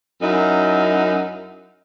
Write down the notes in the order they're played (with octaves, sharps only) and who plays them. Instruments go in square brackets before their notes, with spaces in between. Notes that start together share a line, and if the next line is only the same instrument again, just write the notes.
[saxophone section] F#2 D#4 E4